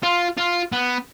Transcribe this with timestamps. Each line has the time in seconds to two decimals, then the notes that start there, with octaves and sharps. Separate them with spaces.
0.03 F4
0.37 F4
0.72 B3